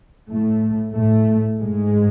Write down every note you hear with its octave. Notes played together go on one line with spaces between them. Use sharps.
A2 A3
A2 A3
G#2 G#3